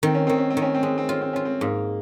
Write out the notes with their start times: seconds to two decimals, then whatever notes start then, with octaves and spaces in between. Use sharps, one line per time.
0.03 D#3 C4
0.15 C#4
0.27 D#3 C4
0.38 C#4
0.50 C4
0.57 D#3
0.62 C#4
0.75 C4
0.83 G#3 C#4
0.98 C4
1.09 C#4 F4
1.22 C4
1.33 C#4 F4
1.45 C4
1.61 G#2 A#3